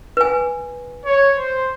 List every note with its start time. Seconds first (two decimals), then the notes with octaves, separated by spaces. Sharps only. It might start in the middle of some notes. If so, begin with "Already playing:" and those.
0.17 B4 G#5
1.05 C#5
1.37 C5